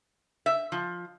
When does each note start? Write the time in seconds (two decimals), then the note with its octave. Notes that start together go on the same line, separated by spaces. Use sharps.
0.46 E5
0.72 F3